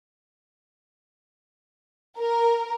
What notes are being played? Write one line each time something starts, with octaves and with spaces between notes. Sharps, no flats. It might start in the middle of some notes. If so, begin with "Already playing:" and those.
A#4